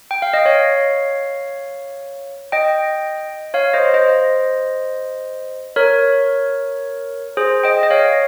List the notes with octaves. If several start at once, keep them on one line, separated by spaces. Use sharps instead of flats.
G5
F5
D#5
C#5 F5
D#5 G5
C#5 F5
C5 D#5
C5 D#5
A#4 C#5
G#4 C5
D#5 G5
D#5
C#5 F5